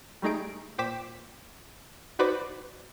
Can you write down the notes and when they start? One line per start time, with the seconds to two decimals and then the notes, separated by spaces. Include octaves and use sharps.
0.22 G3 A3 D#4 G#4 D7
0.78 A#2 C5 G5 D6 B6 E7
2.19 D#4 F#4 B4 C5 D5 D6